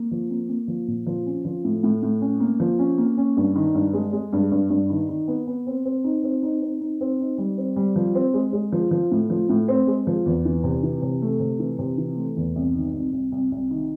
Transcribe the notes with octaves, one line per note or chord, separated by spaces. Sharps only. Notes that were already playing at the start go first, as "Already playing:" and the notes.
Already playing: A#3
F3
A#3
A#3
F3
A#2
F3
C#4
F3
A2
A2
A2
C#4
A#3
F3
C#4
A#3
C#4
G2
D#3
G2
G#3
G#3
G2
G2
G2
D#3
D#3
B3
B3
C4
C4
D#4
C4
D#4
C4
D#4
C4
D#4
G3
C4
G3
F3
C4
G#3
G#3
F3
F3
A2
F3
A2
C4
G#3
F3
E2
E3
C3
E3
C3
A3
C3
E3
C3
E3
A3
E2
C2
D#3
C2
C2
C2
C2
D#3